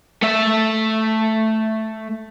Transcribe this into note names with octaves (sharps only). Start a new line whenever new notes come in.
A3 E5